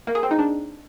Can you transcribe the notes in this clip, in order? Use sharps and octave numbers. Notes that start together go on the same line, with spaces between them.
A#3
G#4
C4
D#4
D4